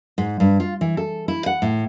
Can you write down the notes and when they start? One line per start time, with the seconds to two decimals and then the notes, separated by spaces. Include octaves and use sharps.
0.18 G#2
0.40 G2
0.60 F4
0.81 E3
0.97 A4
1.28 E4
1.46 F#5
1.62 A2